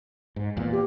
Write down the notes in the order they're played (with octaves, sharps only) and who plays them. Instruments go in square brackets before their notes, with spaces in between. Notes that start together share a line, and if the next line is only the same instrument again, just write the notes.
[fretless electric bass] G#2
E2 A#2
[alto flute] G4